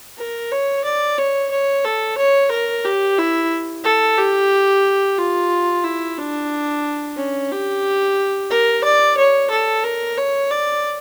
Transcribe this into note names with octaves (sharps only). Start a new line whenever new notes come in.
A#4
C#5
D5
C#5
C#5
A4
C#5
A#4
G4
E4
A4
G4
F4
E4
D4
C#4
G4
A#4
D5
C#5
A4
A#4
C#5
D5